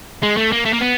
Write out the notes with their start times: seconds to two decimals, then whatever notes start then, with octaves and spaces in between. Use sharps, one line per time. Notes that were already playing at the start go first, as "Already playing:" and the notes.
0.23 G#3
0.37 A3
0.52 A#3
0.65 A3
0.73 A#3
0.81 B3